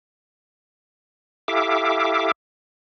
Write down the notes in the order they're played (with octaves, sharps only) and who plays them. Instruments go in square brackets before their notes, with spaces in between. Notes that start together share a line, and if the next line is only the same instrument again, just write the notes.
[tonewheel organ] E4 G4 A4 E5 F5 D6